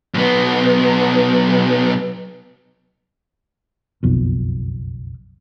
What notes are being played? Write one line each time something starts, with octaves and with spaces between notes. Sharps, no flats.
B1 B3
F#1 B1 F2